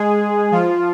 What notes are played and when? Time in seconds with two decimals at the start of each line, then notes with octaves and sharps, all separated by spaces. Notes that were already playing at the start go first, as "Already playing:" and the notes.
Already playing: G#3 G#4
0.51 F3 F4